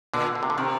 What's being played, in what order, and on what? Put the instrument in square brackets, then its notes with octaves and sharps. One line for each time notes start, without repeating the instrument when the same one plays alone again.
[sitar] A#2 [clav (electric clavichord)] D3
[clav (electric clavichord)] D3
C3
D3
[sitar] C3 [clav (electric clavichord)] D#3